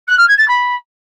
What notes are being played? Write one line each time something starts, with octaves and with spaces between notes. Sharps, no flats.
F#6
F6
G#6
A6
B5